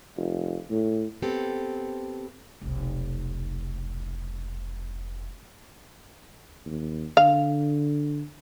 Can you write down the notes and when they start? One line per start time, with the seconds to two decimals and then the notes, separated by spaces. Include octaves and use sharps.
0.17 F1
0.71 A2
1.22 B3 C4 G4 A4
2.61 F1 B1
6.65 D#2
7.17 D3 F5